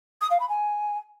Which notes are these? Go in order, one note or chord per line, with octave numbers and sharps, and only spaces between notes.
D#6
F5
B5
G#5